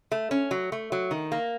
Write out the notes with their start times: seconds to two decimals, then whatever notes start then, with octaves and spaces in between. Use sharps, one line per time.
0.12 A3
0.31 C#4
0.51 F#3
0.72 A3
0.92 F#3
1.11 D#3
1.32 A#3